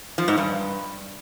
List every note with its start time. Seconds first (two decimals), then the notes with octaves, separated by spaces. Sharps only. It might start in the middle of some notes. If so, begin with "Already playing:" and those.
0.18 F3
0.28 G#2
0.38 G2